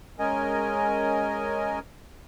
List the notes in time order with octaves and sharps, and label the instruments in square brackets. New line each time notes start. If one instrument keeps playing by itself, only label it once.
[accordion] G#3 C#4 A#4 D#5 G#5